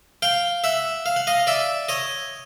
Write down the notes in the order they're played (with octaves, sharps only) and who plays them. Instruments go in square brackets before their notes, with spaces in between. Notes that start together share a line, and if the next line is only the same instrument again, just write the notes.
[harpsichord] F5 G5
E5 F#5
F5
F#5
D#5 F5
D5 E5
C#5 D#5